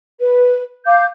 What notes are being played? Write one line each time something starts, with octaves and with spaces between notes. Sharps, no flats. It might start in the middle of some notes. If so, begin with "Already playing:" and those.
B4
F5 D6 G6